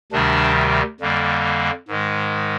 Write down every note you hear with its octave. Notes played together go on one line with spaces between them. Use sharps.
D2 C3 D#3 G3 D4
F2 D3 G3 A#3
G#2 D#3 G#3